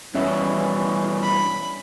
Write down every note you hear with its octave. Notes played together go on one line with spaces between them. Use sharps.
G2 B2 E3 C#4 E5
B5